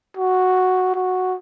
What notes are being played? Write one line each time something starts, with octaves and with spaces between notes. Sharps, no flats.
F#4
F#4